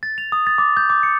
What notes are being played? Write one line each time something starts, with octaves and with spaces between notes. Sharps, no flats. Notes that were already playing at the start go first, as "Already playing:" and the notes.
A6
F7
D#6
A6
D6
G6
D6
C#7